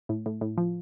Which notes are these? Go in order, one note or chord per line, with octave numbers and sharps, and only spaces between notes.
A2
A2
A2
F3